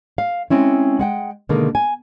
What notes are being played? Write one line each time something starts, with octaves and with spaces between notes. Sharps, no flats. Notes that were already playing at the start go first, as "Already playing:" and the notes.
F5
G#3 C4 C#4 E4
G#3 F#5 G5
B2 D3 D#3 G#3 A#3
G#5